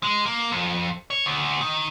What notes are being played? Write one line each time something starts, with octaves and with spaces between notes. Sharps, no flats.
G#3
A#3
F2
C#5
D2
D#3